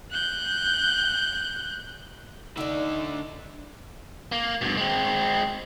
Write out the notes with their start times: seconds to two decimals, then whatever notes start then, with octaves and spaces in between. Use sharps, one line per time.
0.11 F#6 G6
2.57 D3 D4 D#4 D5 E5
4.32 A#3
4.62 G2 B2
4.78 G#3 C4